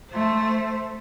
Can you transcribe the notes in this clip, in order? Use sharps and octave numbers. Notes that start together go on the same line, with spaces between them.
A3 C5